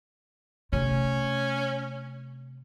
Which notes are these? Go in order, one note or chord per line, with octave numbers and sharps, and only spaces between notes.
C3 A3 C#4